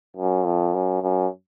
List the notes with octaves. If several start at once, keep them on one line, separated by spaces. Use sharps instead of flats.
F#2
F2
F#2
F#2